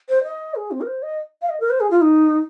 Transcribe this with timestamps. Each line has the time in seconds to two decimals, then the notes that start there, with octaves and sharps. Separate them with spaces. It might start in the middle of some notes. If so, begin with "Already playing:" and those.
0.09 C5
0.24 D#5
0.55 G#4
0.71 C4
0.81 A#4
0.87 C5
1.03 D#5
1.42 F5
1.50 D#5
1.60 A#4
1.70 C5
1.80 G#4
1.91 F4
2.01 D#4